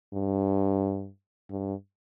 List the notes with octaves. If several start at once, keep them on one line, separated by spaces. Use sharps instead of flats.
G2
G2